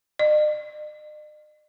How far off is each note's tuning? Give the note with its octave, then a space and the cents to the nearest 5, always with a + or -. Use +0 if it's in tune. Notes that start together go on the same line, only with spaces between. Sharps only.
D#5 -45